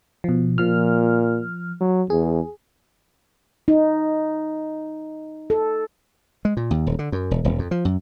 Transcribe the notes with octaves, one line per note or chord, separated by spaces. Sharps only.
B2 F3
A#2 F3 F6
F#3
E2 G#4
D#4
A4
G#3
A#2
D#2
D#1
D3
F#2
E1
D#1
F2
F3
F#2